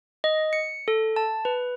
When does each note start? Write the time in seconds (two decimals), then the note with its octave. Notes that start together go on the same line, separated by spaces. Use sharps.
0.24 D#5
0.53 C#7
0.88 A4
1.16 A5
1.45 B4